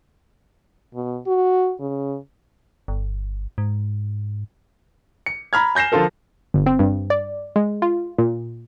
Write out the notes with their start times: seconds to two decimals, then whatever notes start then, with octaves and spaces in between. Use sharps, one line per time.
0.94 B2
1.27 F#4
1.80 C#3
2.88 G1
3.58 G#2
5.26 C#7
5.53 A#5 B5 F6 G#6
5.75 G#5 G6 A#6 C7 E7
5.92 D3 F3 F4 A4 A#4
6.54 G1
6.66 C4
6.79 G2
7.10 D5
7.56 G#3
7.82 F4
8.18 A#2